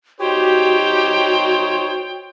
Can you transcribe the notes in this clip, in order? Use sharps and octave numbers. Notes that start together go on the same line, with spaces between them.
D#4 F#4 G4 C5 C#5 G5